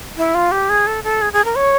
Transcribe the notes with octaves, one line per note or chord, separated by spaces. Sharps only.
E4
F4
G4
G#4
A4
A4
G#4
G#4
A#4
C#5